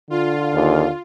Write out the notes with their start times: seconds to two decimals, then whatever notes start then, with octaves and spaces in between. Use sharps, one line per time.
0.10 D3 F4
0.54 D#2